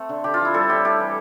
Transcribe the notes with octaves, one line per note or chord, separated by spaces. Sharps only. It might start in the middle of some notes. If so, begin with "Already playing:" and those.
Already playing: A3 C4
D3
D3 G4
F4
F3
E4
G3 A4
A2 G4
A2 G4
E3